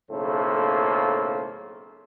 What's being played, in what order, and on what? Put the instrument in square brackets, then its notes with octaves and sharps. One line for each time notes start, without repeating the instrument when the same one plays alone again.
[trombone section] B1 A2 C#3 A#3 A4 C5